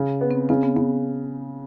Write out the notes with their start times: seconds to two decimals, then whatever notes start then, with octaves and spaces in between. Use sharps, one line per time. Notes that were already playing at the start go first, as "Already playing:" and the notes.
Already playing: C#3
0.21 B3
0.31 C4
0.49 C#3 C4
0.63 B3
0.76 C#3 B3